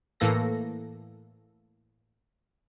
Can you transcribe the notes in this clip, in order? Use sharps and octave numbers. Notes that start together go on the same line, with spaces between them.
A2 E3 A#3 A4 A#6